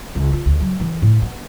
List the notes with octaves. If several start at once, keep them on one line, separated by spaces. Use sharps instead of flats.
C#2
F4
D2
F#3
E3
A2
B3